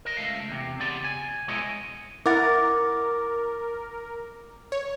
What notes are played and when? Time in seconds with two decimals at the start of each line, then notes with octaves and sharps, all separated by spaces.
0.05 A#4 D#5
0.17 C#2 E3 A3 F5
0.48 E2 C3
0.80 C#3 B3 G4 D5 C6
1.04 G#5
1.48 B2 G#3 E4 C#5 D#5 C6
2.26 E4 A#4 F#5 D6 A6
4.72 C#5